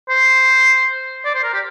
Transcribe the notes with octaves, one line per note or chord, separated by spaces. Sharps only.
C5
D5
C5
A#4
G4